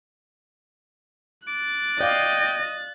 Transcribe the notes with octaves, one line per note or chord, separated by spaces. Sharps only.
D6 F#6 A6
D5 D#5 F5 G5